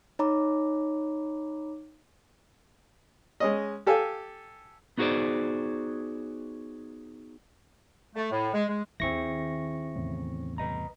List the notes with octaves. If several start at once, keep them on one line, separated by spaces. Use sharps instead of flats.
D#4 C#5 A#5 B5 D6
G#3 C#4 D#5
G4 A4 F5 G#5
B3 D#4 F#4 G#4 C5 D5
A3
A2
G#3
G#3
D#2 D#3 C4 E4 G#4 C#6 A#6
E2 A2 C#3
C2 B4 D#5 A#5